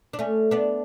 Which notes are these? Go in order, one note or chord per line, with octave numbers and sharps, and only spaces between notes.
D4
A3 C#4
B3 D4